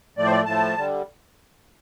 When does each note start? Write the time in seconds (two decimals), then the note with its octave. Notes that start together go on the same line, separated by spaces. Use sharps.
0.17 A2 F3 A3 D5
0.26 C5
0.32 D5
0.46 A2 F3 A3 A5
0.77 D3 G3